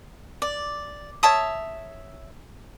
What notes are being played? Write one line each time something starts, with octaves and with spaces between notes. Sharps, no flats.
D5
C#5 E5 A5 D#6